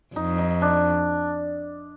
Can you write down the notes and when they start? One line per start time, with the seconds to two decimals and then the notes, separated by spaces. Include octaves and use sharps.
0.15 F2 D#4
0.39 D#4
0.62 D4